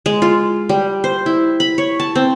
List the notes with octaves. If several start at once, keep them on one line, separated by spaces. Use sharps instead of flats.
G#3
F4
G3
C5
E4
B5
C#5
A5
C4